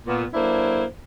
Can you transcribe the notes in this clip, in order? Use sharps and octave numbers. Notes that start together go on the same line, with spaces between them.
A#2 B3
F#3 A#3 D4 E4 A4 C5